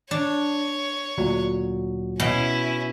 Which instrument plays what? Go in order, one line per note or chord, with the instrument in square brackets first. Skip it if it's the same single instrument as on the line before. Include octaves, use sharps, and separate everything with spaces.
[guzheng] D4 [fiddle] C#5
[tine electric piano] D2 A#2 F#3
[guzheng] B2 [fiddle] C#4 E4